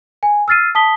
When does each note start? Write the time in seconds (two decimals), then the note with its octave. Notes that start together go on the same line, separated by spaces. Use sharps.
0.23 G#5
0.48 E6 F6 A6 C7 D#7
0.75 A5 D#6 B6 G7